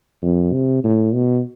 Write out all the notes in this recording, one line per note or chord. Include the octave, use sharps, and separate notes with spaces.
F2
C3
A2
B2